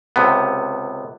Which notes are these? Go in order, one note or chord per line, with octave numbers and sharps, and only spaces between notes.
C#2 C3 B3